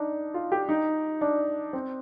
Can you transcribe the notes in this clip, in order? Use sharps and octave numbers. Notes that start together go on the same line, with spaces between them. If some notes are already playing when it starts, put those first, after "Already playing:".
Already playing: D4 D#4
F4
G4
D#4
D4
C4